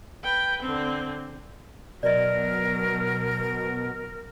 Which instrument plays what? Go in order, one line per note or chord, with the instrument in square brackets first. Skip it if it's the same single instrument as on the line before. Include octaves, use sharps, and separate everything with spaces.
[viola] B4 G5
D3 C4
[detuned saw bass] B2 [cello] F#3 [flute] A#4 [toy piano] D5 D#5